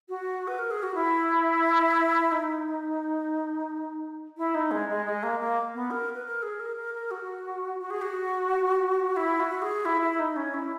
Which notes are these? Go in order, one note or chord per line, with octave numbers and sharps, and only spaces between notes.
F#4
B4
A#4
G#4
F#4
E4
D#4
E4
D#4
G#3
G#3
G#3
A#3
A#3
B3
A#4
B4
A#4
G#4
A#4
A#4
A#4
F#4
F#4
G#4
F#4
E4
F#4
G#4
E4
E4
D#4
C#4
E4